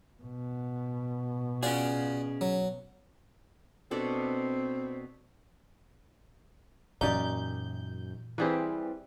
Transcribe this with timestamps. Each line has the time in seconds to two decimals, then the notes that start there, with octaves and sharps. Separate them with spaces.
0.23 B2
1.63 C#4 F4 F#4 G#4 D5
2.41 F#3
3.91 B2 C4 D4 A4
7.01 F#2 A#2 E3 D#4 G4 D5 G6
8.38 E3 G3 C4 G4 G#4 B4